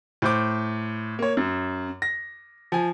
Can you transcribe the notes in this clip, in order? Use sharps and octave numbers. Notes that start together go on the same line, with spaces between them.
A2 C5 D6
A#3 C#5
F#2
A#6
F3 G#5